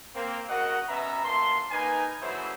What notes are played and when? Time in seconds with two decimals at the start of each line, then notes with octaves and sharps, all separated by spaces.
0.15 A#3 C4
0.49 C#3 F#4 A#4 D#5 F#5
0.89 B2 C#4 B4 E5 A#5
1.25 F#2 A#2 A5 C6
1.71 A#3 D#4 B4 G#5
2.22 C#3 E3 F#3 A3 E4 C5